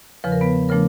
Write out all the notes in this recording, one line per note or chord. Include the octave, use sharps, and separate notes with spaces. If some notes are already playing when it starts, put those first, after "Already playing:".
E2 C#3 F3 B4
A#4
B3 B4
C#3 F3 A3 D4 A#4